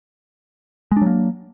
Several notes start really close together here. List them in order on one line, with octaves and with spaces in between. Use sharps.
G#3 D4 F#3 A#3